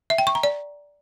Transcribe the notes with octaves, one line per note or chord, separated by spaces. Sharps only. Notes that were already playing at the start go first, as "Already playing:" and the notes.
E5
G5
C#6
A#5
D5